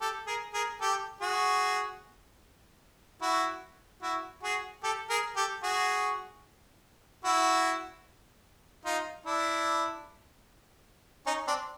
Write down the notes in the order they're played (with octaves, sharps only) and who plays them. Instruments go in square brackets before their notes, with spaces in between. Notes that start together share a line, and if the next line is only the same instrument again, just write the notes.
[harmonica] G4 A4
G#4 A#4
G#4 A#4
G4 A4
F#4 G#4
E4 F#4
E4 F#4
F#4 G#4
G4 A4
G#4 A#4
G4 A4
F#4 G#4
E4 F#4
D#4 F4
D4 E4
C#4 D#4
C4 D4